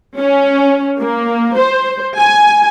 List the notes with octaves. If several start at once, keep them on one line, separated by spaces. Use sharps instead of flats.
C#4
A#3
C5
G#5